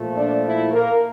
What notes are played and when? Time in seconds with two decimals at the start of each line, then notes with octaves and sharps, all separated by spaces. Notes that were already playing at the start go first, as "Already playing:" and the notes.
Already playing: A#2 F3 A3
0.16 D4 D5
0.43 E4 E5
0.72 A#3 A#4